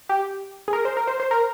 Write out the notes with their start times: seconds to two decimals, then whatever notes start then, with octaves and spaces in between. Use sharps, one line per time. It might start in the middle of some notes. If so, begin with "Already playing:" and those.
0.09 G4
0.68 G#4
0.73 A#4
0.85 C5
0.97 A#4
1.07 C5
1.20 C5
1.31 A#4